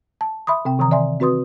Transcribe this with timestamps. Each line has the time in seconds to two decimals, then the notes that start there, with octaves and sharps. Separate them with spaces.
0.21 A5
0.47 E5 B5 C6 D#6
0.65 C3 C4 G5
0.79 C3 D#3 E3 A#5 D#6
0.91 D5 E5 G#5 C6
1.20 C4 F#4 B4 C6 D#6